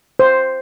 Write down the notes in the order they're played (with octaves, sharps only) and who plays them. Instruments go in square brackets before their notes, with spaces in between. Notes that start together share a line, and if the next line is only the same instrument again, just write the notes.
[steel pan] C5